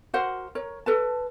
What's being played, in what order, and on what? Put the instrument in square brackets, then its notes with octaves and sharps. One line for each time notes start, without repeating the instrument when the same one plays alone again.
[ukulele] F#4 A#4 C5 F#5
A#4 C#5
A4 B4 A5